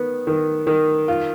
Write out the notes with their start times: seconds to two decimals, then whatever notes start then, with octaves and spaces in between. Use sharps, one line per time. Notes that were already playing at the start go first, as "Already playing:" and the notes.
Already playing: D#3 B3
0.27 D#3
0.67 D#3
1.08 F4